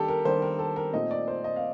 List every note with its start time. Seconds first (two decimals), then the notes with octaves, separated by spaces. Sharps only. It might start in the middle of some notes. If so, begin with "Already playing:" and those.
Already playing: D#3 G3 A#3 D4 G4 A4
0.08 A#4
0.25 D#3 G3 A#3 D4 C5
0.42 A#4
0.59 A4
0.76 A#4
0.94 A#2 A3 C4 D#4 D#5
1.11 D5
1.28 C5
1.44 D#5
1.56 F5